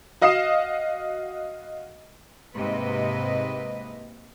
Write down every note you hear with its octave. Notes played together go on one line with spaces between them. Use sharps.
F#4 D#5 F5 D#6 C7 E7
G#2 C3 A#3 B4 D#5